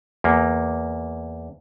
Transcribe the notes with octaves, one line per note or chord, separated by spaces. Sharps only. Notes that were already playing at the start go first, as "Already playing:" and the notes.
E2 A#3